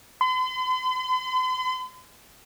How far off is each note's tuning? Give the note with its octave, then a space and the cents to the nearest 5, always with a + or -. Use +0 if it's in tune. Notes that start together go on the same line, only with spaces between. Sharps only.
C6 -45